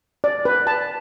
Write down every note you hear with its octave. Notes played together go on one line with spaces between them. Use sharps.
D5
B4
A5